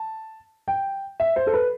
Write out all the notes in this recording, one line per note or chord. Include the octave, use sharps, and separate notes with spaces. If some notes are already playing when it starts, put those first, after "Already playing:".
Already playing: A5
G5
E5
C5
A4
B4